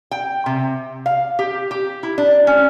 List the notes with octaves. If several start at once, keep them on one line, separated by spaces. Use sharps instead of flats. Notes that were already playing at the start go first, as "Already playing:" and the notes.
G5
C3
F5
G4
G4
E4
D4
C#4